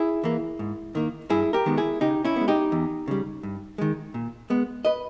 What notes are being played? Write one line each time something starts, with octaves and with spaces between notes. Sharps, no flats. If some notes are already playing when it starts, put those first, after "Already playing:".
Already playing: E4 G#4
E3 A#3
G#2
D#3 A#3
G2 E4 G#4
G4 A#4
D#3 G#3 B3
E4 G#4
C#3 D#4 G4
C#4 E4
G#3 B3
D#4 G4
E2
C#3 G3
G2
D#3 G#3
A#2
G#3 B3
B4 D#5